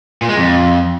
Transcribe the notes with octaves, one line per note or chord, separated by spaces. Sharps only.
A#2
G#3
F2